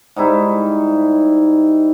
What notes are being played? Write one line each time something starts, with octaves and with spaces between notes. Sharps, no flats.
G#2 G3 D#4 E4